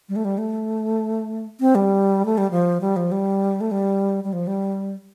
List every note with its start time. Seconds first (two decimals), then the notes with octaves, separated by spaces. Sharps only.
0.09 G3
0.16 A3
0.25 G3
0.38 A3
1.60 C4
1.75 G3
2.26 A3
2.38 G3
2.51 F3
2.81 G3
2.96 F3
3.12 G3
3.61 A3
3.71 G3
4.24 G3
4.33 F3
4.47 G3